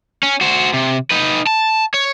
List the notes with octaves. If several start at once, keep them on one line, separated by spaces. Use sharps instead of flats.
C#4
F#4 C5
C3
D#4 B4
A5
C#5